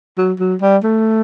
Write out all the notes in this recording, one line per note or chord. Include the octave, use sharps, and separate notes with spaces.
F#3
F#3
G3
A3